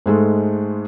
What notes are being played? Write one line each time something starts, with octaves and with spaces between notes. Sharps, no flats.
G#2 G#3 A3